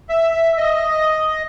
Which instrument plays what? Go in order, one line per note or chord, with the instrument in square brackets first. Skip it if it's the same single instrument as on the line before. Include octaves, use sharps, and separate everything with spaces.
[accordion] E5
D#5